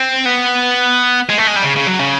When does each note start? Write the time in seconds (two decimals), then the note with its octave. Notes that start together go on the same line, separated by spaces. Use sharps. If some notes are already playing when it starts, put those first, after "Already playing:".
Already playing: C4
0.26 B3
1.29 G#3
1.38 A3
1.48 G#3
1.56 G3
1.64 C#3
1.77 C#3
1.87 F#3
2.00 C#3